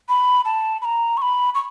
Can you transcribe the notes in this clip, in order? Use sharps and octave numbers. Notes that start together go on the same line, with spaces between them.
B5
A5
B5
A#5
C#6
B5
C#6